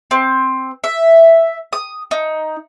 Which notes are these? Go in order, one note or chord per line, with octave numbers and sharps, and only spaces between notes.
C4
E5
D#6
D#4